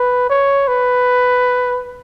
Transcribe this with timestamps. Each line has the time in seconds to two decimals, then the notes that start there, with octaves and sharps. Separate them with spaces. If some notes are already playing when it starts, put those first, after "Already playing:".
Already playing: B4
0.30 C#5
0.68 B4